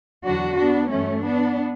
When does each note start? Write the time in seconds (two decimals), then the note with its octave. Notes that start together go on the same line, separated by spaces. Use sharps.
0.24 E2 D3 F#3 D4 F#4
0.58 B3 D4
0.91 G2 E3 A3 C#4
1.24 B3 D4